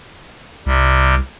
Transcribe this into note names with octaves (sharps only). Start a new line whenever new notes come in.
C2 C3 G3